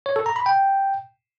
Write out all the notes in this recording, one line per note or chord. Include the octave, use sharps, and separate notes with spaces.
C#5
A4
A#5
B5
G5